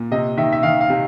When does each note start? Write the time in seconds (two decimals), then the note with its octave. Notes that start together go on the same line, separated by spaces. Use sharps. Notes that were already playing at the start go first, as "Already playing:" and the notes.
Already playing: A#2
0.11 C3 D#5
0.37 D#3 E5
0.53 E5
0.63 D#3 F5
0.81 F5
0.90 C3